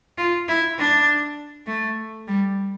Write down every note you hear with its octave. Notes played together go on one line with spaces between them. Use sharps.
F4
E4
D4
A3
G3